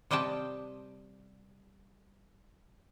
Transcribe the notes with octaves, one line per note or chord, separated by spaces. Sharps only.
C3 G3 D#5 G5 A5